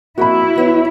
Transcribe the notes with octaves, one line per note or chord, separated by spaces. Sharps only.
F2 A#3 E4 F#4 B5
E3 B3 C#5